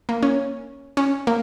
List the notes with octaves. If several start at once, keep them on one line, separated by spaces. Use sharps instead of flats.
A#3
C#4
C#4
A#3